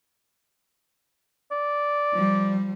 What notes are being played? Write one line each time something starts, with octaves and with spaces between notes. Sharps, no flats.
D5
F3 G3